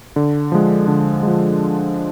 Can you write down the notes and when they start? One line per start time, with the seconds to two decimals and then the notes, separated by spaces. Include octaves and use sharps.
0.16 D3
0.52 F3 G#3
0.88 D3
1.23 F3 G#3